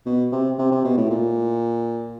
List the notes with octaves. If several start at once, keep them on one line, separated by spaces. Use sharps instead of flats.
B2
C3
C3
C3
B2
A2
A#2